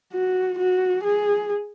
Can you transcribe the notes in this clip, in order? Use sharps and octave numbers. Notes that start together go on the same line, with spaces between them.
F#4
F#4
G#4